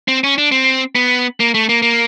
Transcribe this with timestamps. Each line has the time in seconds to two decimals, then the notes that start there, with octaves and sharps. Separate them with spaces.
0.08 C4
0.24 C#4
0.38 D4
0.52 C4
0.95 B3
1.40 A#3
1.54 A3
1.69 A#3
1.82 A#3